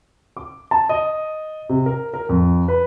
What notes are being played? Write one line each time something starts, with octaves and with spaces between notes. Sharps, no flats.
D6
A5
D#5
C3
A#4
A#4
F2
B4